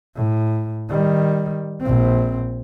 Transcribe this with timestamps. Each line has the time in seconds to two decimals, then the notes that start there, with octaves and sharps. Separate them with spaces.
0.16 A2
0.89 D#3 G3
1.81 A#1 C4